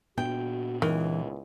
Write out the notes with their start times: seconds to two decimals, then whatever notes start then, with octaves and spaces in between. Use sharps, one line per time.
0.18 A#2 B3 D4 F#4 G5
0.82 C#2 D#3 E3